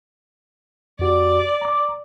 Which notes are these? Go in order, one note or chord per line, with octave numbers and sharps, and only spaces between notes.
F2 F#4 G4 D5
A#5 D6